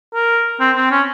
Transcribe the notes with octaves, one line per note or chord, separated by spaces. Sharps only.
A#4
C4
C4
C#4